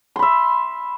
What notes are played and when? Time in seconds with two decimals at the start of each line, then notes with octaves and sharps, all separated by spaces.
0.16 C6
0.19 B5
0.22 E5